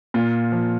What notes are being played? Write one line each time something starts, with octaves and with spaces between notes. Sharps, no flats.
A#2 F4
F3